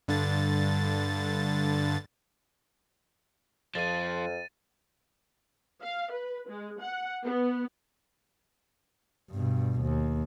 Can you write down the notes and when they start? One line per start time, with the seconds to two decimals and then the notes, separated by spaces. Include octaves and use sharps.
0.08 G2 D3 A6
3.75 F2 F3 F4 A6 D#7
5.82 F5
6.12 B4
6.49 G#3
6.80 F#5
7.24 B3
9.30 G2 B2
9.82 D#2